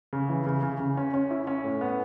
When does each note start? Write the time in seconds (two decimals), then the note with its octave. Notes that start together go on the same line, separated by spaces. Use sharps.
0.13 C#3
0.29 E3
0.47 C#3
0.63 C#3
0.80 C#3
0.97 C#4
1.14 C#4
1.30 E4
1.47 C#4
1.64 A2
1.81 B3